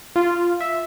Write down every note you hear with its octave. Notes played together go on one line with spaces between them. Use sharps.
F4
E5